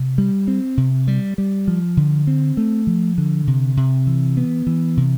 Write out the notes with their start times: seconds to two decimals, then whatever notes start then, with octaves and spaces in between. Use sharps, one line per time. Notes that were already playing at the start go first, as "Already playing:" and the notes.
Already playing: C3
0.18 G3
0.48 C4
0.77 C3
1.08 G3
1.38 G3
1.68 F3
1.97 D3
2.27 C4
2.57 A3
2.87 F3
3.18 D3
3.47 C3
3.77 C3
4.07 E3
4.37 B3
4.67 E3
4.97 C3